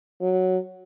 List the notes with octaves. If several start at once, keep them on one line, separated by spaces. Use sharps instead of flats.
F#3